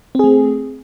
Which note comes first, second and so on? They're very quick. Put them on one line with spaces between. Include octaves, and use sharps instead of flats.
C4 G#4 A3